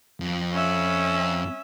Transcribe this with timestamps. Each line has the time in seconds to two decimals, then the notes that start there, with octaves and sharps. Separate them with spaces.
0.20 F2
0.54 C#4 E5